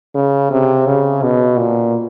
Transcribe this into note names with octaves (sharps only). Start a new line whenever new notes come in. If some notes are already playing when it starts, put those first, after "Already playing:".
C#3
C3
C#3
B2
A#2